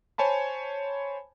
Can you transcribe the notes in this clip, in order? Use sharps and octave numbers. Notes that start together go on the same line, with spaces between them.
C5 C#5 G#5 A5 B5